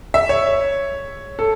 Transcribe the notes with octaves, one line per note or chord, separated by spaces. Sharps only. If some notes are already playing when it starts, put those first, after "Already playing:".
E5
C#5
A4